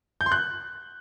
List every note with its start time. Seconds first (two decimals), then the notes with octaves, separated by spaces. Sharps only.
0.21 G6
0.26 C6
0.32 F#6